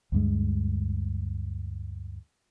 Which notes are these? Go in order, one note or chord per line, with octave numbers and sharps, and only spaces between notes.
D2 G2 G#3